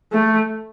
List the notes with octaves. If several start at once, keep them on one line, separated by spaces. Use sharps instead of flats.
A3